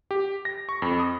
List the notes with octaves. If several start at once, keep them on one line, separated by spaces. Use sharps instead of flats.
G4
A#6
C#6
F2
D#6